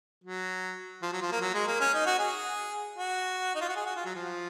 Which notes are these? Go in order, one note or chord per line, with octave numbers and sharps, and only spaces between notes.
F#3
F3
F#3
F3
A#3
F#3
G#3
A#3
C#4
D#4
F#4
G#4
F#4
D#4
F4
F#4
G#4
F#4
F4
F#3
F3